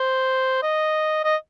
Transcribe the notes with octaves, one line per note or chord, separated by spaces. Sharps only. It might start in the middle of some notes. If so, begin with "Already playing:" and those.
Already playing: C5
D#5
D#5